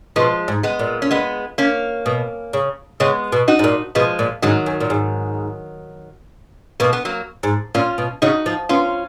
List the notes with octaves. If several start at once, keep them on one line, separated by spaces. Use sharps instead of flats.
B2 F3 G#3
G#2
G#3 B3
A#2
C#4
G#3 B3
A#3 C#4
B2
C#3
C#3 G#3 B3
B2
D#4 F#4
G#2
A#2
B2 F3 G#3
A#2
G#2 D#3 F#3
F#2
A#2
G#2
B2 A#3
B3
F#3 A#3
G#2
A#2 C#4 F4
B2
C#3 D#4 F#4
F3
B3 C#4 F4